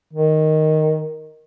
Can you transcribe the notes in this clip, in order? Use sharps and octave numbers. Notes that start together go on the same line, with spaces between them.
D#3